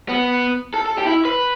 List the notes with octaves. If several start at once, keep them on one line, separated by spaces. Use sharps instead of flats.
B3
A4
A4
G4
E4
B4